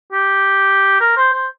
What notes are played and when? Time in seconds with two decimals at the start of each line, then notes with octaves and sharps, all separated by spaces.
0.12 G4
1.01 A#4
1.17 C5
1.34 C5